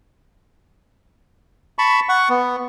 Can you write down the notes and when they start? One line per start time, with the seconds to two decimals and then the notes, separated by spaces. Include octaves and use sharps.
1.79 A5 B5 C#6
2.09 F#5 C#6
2.29 B3